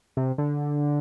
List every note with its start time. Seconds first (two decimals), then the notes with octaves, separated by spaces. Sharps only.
0.17 C3
0.38 D3